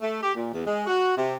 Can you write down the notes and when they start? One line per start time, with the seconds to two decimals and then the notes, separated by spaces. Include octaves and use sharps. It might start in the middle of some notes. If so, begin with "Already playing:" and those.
0.02 A3
0.22 G4
0.35 A#2
0.52 E2
0.66 G#3
0.86 F#4
1.16 C3